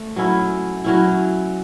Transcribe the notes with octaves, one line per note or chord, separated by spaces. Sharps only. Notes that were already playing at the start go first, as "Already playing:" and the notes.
Already playing: A3
F#3 C#4 E4
F#3 C#4 E4